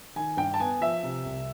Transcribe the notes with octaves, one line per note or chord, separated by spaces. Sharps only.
D#3 G#5
G2 G5
A5
B3 G#5
F3 E5
C3
C2